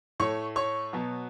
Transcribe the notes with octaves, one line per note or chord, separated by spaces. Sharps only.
A2 A3 C#5 C#6
C#5 C#6
B2 F#3 B3